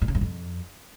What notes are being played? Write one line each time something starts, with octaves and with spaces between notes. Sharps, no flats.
A2
C#3
F#2
F2